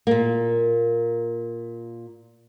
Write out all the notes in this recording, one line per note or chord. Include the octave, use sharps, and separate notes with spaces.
A#2 A#3